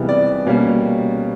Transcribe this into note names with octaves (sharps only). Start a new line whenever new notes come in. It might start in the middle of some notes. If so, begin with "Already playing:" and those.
Already playing: C#2 C3 E3 G3 B3
D5
B2 G3 A#3 C#4